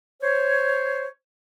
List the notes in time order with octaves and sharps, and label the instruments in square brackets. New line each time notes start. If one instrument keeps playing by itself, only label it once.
[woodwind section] C5 C#5